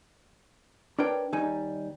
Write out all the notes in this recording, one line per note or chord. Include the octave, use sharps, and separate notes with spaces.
D4 A#4 B4 C#5 G5
D#2 G3 D#4 G#5